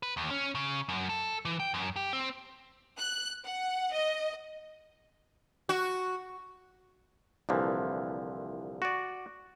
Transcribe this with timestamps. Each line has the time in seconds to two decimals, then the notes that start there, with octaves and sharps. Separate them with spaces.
0.03 B4
0.17 D#2
0.31 C#4
0.55 C#3
0.89 F#2
1.09 A4
1.45 E3
1.60 G5
1.74 F#2
1.96 G4
2.13 C4
2.98 F#6
3.44 F#5
3.92 D#5
5.69 F#4
7.49 C2 A#2 D3 E3 F3
8.82 F#4 D5